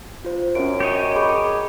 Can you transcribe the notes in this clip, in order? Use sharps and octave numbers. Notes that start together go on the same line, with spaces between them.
F4 C5
F#2 C#4 D7
G4 C#5 D#5
G#4 B5 D6